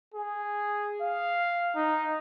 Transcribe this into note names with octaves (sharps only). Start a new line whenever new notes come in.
G#4
F5
D#4